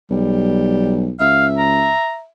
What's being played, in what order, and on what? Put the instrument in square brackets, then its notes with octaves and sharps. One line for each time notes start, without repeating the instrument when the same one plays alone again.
[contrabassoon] B1 [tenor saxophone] G3
[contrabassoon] C#2 [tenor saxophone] E5 [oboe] F5
[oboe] A#5